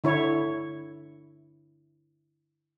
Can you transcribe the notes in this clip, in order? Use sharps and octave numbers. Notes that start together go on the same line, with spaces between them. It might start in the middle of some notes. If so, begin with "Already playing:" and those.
D3 E4 C#5